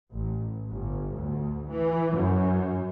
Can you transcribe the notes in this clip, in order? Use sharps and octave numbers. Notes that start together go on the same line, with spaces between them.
A1
G1
D2
E3
F#2